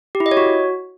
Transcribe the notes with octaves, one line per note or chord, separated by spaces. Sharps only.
G4
E4
D#5
C#5
F#4